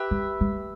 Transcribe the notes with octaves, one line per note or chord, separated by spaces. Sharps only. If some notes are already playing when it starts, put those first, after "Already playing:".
Already playing: G4 B4 E5
C4
A3